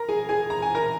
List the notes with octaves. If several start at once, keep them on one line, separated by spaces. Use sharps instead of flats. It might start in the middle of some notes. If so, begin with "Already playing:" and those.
Already playing: A#4 A#5
G#4 G#5
G#4 G#5
A#5
G#5
A#4 A#5